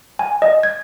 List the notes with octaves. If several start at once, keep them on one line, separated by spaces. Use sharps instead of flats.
G#5
D#5
G#6